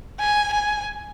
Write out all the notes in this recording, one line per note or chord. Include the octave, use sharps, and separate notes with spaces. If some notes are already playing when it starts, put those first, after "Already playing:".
G#5
G#5